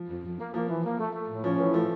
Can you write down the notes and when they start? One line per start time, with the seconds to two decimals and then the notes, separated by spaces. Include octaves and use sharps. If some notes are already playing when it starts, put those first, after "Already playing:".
Already playing: F3
0.09 F2
0.23 F2
0.38 A#3
0.53 F3 A#3
0.69 E3
0.84 A#3
0.99 A3
1.14 A3
1.29 A2
1.43 F3 C#4
1.59 A2 E3
1.74 F3 A3